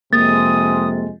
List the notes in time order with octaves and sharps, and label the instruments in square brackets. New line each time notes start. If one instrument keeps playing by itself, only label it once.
[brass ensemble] F2 C3 G#3 [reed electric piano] A#3 [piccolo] D#6 [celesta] A6